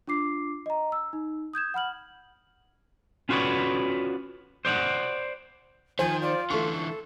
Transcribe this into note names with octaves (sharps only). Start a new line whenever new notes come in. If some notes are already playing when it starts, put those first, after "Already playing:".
D4 F4 D6 C7
D#5 A#5
E6
D#4
D#6 G6 G#6 E7
F#5 B5 F6 F#7
C#4 F4 F#4 B4 C#5 D5
C5 D5 E5 F#5
D#3 F3 C5 G#5
F4 D5
D3 E3 A3 A4 C#6